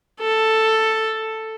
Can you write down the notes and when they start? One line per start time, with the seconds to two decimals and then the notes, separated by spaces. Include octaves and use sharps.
0.21 A4